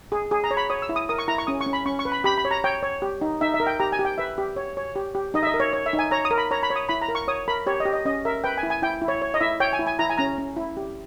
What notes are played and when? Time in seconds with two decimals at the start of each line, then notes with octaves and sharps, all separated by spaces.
0.12 G#4
0.31 G#4
0.44 A#5
0.51 C#5
0.57 B5
0.70 C#5 D#6
0.82 E6
0.89 E4
0.96 D#6
1.09 A#4 D#6
1.18 C#6
1.28 E4 A#5
1.38 C#6
1.47 C#4 D#6
1.61 C#6
1.66 C#4
1.73 B5
1.86 C#4 C#6
1.99 C#6
2.05 B4
2.12 B5
2.24 G4 B5
2.38 B5
2.45 C#5
2.51 A#5
2.64 C#5 G5
2.83 C#5
3.02 G4
3.21 D#4
3.41 D#4 E5
3.54 E5
3.60 A#4
3.67 G5
3.80 G4 A#5
3.92 G#5
3.99 G4
4.05 G5
4.18 B4 E5
4.38 G4
4.56 C#5
4.77 C#5
4.96 G4
5.15 G4
5.34 D#4 D#5
5.43 E5
5.47 D#5
5.54 A#4
5.60 C#5
5.73 C#5
5.86 E5
5.93 D#4
5.99 G#5
6.11 C#5 A#5
6.25 D#6
6.31 A#4
6.38 B5
6.51 C#5 A#5
6.63 B5
6.70 C#5
6.76 D#6
6.89 E4 B5
7.02 A#5
7.08 A#4
7.15 C#6
7.28 C#5 D#6
7.48 A#4 B5
7.67 G4 C#5
7.80 D#5
7.85 G4
7.93 D#5
8.05 C#4 D#5
8.25 A#4 E5
8.44 B4 G5
8.58 G#5
8.63 E4
8.70 G#5
8.82 E4 G5
9.02 E4
9.08 C#5
9.22 C#5
9.34 D#5
9.41 E4 E5
9.60 C#5 G5
9.73 G#5
9.79 E4
9.87 G#5
9.99 E4 A#5
10.09 G#5
10.18 C#4 A#5
10.38 C#4
10.56 E4
10.77 G4